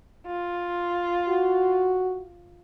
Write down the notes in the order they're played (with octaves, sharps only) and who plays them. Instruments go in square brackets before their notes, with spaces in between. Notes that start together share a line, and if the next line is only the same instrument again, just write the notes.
[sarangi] F4
[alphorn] F#4